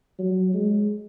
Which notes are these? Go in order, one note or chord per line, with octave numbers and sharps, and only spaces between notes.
F#3
G#3